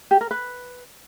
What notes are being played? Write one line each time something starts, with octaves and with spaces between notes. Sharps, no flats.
G4
A#4
B4